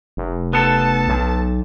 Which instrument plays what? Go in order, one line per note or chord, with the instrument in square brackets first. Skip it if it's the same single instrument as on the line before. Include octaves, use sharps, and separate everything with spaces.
[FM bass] F1
[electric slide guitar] B3 A4 [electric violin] A5
[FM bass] B1